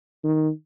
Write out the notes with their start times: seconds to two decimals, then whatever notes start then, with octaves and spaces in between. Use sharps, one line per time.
0.24 D#3